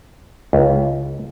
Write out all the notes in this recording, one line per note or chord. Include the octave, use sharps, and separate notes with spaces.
C#2